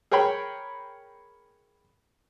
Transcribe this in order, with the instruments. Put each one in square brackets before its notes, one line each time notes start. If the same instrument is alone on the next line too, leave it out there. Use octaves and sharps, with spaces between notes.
[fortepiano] G#4 A#4 C#5 G5 B5